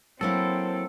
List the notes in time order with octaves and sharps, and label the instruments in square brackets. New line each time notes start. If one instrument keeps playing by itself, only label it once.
[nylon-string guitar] F#3 A#3 E4 [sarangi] C4 [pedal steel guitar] A4